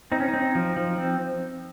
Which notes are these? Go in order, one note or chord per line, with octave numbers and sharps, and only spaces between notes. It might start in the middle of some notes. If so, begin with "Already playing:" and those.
C4 D#4
C#4
D#4
C4
F3
F3
C4